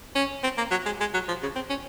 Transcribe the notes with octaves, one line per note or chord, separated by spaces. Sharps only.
C#4
C4
A#3
F#3
G#3
G#3
F#3
F3
C#3
C4
C#4